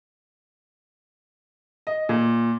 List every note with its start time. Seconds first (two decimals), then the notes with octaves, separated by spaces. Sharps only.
1.87 D#5
2.09 A#2